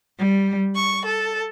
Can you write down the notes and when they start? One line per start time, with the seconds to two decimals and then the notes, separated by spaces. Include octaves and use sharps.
0.18 G3
0.74 C#6
1.05 A4